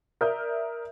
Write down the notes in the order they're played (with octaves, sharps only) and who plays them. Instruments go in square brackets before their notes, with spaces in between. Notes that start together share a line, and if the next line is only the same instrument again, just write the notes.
[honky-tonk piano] A#4 D5 E5 D#6 F6 G6